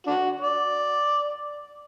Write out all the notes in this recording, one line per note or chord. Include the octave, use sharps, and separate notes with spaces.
D4 F#4
D5